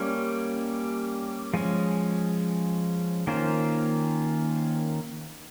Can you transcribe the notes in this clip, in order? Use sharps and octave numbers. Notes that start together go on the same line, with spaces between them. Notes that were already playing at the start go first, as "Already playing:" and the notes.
Already playing: G3 A#3 C#4
F3 G#3 C#4
D#3 A#3 C#4 F4 C5